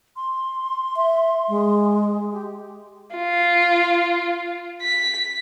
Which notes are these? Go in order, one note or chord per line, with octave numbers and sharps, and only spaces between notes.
C6
E5
G#3
G4
F4
B6